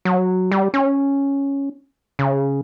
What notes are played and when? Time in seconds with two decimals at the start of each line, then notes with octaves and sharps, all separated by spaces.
0.05 F#3
0.51 G3
0.74 C#4
2.19 C#3